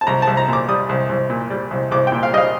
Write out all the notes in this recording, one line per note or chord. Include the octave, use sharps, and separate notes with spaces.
A5
C2 A#5
A5
C2
A#5
A#2 D6
G3 D#6
C2
C2
A#2
G3
C2
C2 D6
A#2 G5
F5
G3 D#5 F5